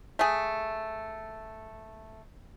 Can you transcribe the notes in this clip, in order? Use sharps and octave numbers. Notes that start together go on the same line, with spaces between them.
A3 G#4